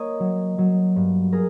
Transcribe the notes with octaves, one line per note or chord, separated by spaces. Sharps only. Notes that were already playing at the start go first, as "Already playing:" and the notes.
Already playing: A#3 C#5 D#5
F#3
F#3
G2
G#4 A#4